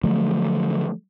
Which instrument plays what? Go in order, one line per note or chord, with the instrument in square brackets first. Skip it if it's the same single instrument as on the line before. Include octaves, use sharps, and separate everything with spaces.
[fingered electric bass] D3 F3 F#3 A3